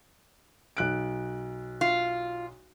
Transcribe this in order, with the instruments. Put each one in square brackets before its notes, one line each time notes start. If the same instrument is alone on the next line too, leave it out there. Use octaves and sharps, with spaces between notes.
[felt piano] B1 F#6 D7
[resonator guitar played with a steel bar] F4